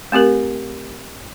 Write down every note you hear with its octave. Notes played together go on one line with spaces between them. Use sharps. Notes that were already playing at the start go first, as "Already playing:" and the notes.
A3 C4 G4 A#4